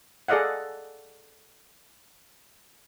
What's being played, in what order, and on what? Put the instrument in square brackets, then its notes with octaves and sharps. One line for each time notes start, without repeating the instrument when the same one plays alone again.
[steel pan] G#4 A4 D5 D#5 F5 F#5